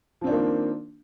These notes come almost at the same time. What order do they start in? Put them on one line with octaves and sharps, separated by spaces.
F3 C4 D4 D#3 A#3